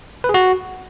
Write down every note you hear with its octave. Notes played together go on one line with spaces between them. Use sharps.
B4
G#4
F#4